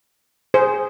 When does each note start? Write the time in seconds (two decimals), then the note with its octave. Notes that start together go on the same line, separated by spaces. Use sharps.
0.54 G#4 C5